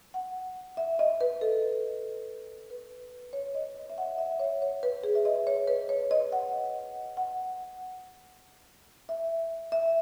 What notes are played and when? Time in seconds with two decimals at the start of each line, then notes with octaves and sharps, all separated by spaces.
0.14 F#5
0.77 E5
0.99 D#5
1.21 B4
1.41 A4
2.70 B4
3.33 C#5
3.55 D#5
3.76 D#5
3.90 E5
3.98 F#5
4.18 E5
4.39 C#5
4.62 C#5
4.83 B4
5.04 G#4
5.15 E5
5.25 D#5
5.47 C#5
5.67 B4
5.89 C#5
6.11 D#5
6.32 F#5
7.17 F#5
9.09 E5
9.72 E5